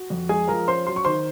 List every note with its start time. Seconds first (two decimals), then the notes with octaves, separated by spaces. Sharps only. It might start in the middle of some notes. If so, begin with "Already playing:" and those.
Already playing: F#4
0.10 F2
0.29 G#3 G#4 G#5
0.48 F3 A#4 A#5
0.68 C#4 C5 C6
0.87 F#3 C6
0.96 C#6
1.05 D#3 C5 C6